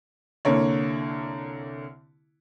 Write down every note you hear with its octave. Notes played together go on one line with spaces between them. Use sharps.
C2 D3 A#3 C#5